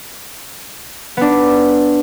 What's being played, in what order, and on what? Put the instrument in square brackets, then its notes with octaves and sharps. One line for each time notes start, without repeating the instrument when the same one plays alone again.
[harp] B3 D4